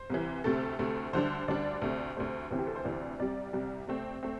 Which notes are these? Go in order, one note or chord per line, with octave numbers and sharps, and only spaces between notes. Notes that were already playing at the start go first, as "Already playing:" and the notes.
Already playing: C5
C2 C3 E3
D2 C3 A3 A4
D2 C3 A3
D2 D3 G3 D4 C5
D2 D3 G3 D4 D5
D2 C3 A3
D2 C3 A3 C5
D2 C3 E3 C4
G4
A4
C5
D2 C3 E3 C4 D5
C2 C3 G3 D5
C2 C3 G3
C3 A3 C4
A3 C4